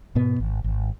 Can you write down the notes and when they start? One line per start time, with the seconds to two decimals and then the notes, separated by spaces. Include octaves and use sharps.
0.15 G#2 B2 B3
0.40 G#1
0.64 G#1